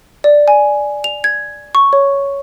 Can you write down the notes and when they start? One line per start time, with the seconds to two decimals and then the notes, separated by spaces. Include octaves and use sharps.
0.24 D5
0.48 G#5
1.04 F7
1.24 G#6
1.75 C#6
1.93 C#5